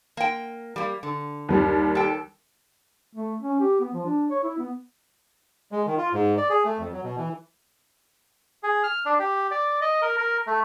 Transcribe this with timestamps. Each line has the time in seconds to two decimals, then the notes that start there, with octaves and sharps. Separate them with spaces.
0.17 A#3 G5
0.76 G3 A#3
1.03 D3
1.49 D#2 G3
1.95 A4 G5
3.15 A3
3.41 C#4
3.60 G4
3.80 B3
3.94 F3
4.06 D4
4.30 C#5
4.43 E4
4.58 B3
5.72 G#3
5.87 D#3
5.98 F4
6.13 G#2
6.37 D5
6.49 G#4
6.65 A3
6.79 F2
6.93 F#3
7.04 B2
7.18 E3
8.63 G#4
8.84 F6
9.06 D4
9.19 G4
9.51 D5
9.82 D#5
10.02 A#4
10.17 A#4
10.47 A3